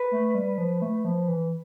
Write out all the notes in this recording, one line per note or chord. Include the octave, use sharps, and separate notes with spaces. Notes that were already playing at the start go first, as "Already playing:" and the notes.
Already playing: B4
A3
G3
F3
A3
F3
E3